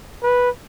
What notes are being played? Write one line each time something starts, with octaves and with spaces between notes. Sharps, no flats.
B4